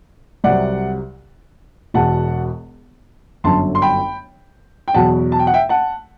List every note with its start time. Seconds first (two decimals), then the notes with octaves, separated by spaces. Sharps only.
0.44 C2 C3 F#3 D5 F#5
1.94 E1 E2 B2 F#5 A5
3.44 G1 F#2 D3 F#3 A5 C6
3.75 C6
3.82 G5 B5
4.88 G5
4.94 E2 B2 F#3 F#5 A5
5.32 A5
5.39 G5
5.47 F#5
5.54 E5 G5
5.69 F#5 A5